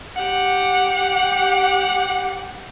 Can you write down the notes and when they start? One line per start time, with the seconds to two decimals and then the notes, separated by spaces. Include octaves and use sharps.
0.17 G4 F#5